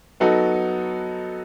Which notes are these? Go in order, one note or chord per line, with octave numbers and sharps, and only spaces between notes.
F#3 B3 D#4 F#4 A4